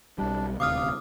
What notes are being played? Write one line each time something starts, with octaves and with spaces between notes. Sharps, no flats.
B1 G3 D4
D#1 D2 C3 F5 D6 D#6 F6